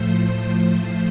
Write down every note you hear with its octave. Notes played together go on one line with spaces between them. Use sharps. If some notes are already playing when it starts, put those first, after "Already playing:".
Already playing: A2 F3 A3 C5
C5